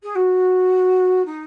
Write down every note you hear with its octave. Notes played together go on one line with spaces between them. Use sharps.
G#4
F#4
D#4